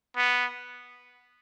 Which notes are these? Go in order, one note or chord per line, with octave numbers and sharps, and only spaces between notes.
B3